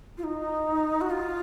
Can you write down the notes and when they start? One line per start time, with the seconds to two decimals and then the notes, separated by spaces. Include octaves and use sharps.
0.18 F4
0.24 D#4
1.01 F#4
1.10 F4